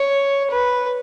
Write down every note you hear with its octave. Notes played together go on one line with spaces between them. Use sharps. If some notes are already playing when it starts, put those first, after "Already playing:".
Already playing: C#5
B4